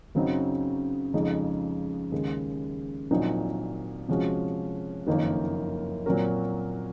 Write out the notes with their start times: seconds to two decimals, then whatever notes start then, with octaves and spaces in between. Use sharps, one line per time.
0.15 F#2 C#3 F#3 C4 D#4
1.14 F2 C#3 G#3 D#4
2.12 D#2 C#3 G#3
3.11 A#1 A#2 F#3 C4 D#4
4.08 C3 F3 G#3 C#4 F#4
5.07 F#1 F2 D#3 A#3 C#4
6.06 A#2 F#3 C4 F#4 A#4